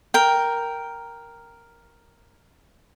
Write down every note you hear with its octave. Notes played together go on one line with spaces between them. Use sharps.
A#4 G5